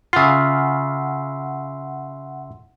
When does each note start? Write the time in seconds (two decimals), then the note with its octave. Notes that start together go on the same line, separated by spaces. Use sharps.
0.13 C#3 F4 E5 F#5 C6